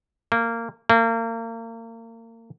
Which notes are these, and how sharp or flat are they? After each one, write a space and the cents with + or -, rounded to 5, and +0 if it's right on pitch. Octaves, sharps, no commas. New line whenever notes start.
A#3 -20
A#3 -35